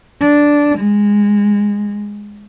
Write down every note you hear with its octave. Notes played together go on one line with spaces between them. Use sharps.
D4
G#3